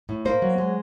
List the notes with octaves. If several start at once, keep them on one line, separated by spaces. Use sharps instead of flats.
A2
A#3 C5
F#3
G#3